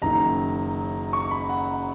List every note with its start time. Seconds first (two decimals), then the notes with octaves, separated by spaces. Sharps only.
0.02 F#1 F#2 D#3 A#5
1.13 C#6
1.31 B5
1.49 F#5